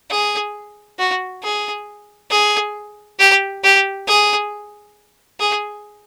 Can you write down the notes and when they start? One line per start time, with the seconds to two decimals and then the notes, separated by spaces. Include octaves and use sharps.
0.11 G#4
0.99 F#4
1.44 G#4
2.31 G#4
3.20 G4
3.64 G4
4.08 G#4
5.40 G#4